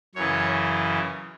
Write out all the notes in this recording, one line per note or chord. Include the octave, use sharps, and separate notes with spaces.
F#2 C#3 E3 C#5